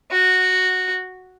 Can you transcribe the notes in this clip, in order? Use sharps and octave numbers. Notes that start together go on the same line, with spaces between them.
F#4